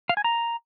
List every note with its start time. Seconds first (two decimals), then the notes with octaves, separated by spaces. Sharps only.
0.09 F5
0.17 G#5
0.24 A#5